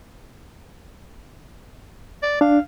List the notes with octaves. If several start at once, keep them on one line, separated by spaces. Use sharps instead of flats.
D5
D4 F5